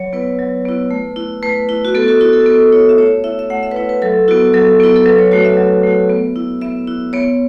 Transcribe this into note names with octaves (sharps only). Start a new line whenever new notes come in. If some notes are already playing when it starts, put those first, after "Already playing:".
Already playing: F#3 C#5
B3 E4 B4
F#3
B3 E4
A3
E4
A3 B4
E4
F#4
B3 A4
F#4
E4 F#4
A4
B3 A4
E4 C#5
E5
A3 C#5
E4 E5
E5
A3 F#5
E5
B4
E4 C#5
B4
F#3 A4
B3 E4 F#4
F#3 A4
B3 E4
A4
F#3 B4
C#5
A3 F#4 C#5
E5
F#3
A3 F#4
B3
E4
B3 E5
E4
B3 C#5